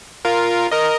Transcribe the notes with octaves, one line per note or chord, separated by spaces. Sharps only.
F4 A#4
A#4 D#5